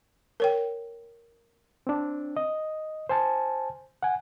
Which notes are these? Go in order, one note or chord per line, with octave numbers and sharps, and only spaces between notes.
A#4 C#5 G5
C4 D4
D#5
C5 G#5 A5
F#5 G#5